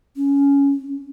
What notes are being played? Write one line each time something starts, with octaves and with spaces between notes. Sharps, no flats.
C#4